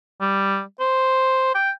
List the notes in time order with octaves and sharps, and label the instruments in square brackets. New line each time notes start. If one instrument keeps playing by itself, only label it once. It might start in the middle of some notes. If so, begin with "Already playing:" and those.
[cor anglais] G3
C5
G5